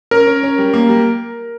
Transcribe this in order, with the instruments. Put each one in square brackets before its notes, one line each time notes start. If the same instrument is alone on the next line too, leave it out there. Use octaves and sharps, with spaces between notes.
[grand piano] C#4 [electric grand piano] A#4
[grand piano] C#4
C#4
G3
A#3
G3